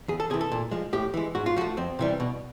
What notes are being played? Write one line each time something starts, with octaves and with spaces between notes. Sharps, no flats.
E2 G#4
A4
C3 E3 G#4
A4
A#2
F3 G#3
A2 G4
E3 G#3
G#2 F#4
F4
F3 A3 F#4
F2 C4
C3 E3 G3
B2